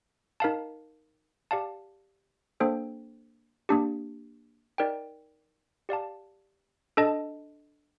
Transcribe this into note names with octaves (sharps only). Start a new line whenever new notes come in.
D#4 A#4 F5 A5
G4 D5 F5 A5
A#3 D4 A4 C5 G5
A#3 D4 G4
D#4 A#4 D5 G5
G4 D5 F5 A5
D4 A4 D#5 A5